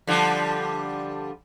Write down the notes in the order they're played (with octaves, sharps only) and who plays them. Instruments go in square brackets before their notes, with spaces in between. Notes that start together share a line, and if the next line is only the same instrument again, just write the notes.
[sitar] D3 F3 G3